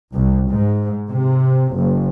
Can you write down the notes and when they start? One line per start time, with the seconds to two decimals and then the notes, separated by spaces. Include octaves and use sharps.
0.13 C2
0.49 G#2
1.09 C3
1.76 F#1